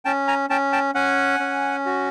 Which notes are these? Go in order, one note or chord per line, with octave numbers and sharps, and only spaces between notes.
C#4 G5 A5
G#5 A#5
C#4 G5 A5
G5 A5
C#4 F#5 G#5
C#4
F#4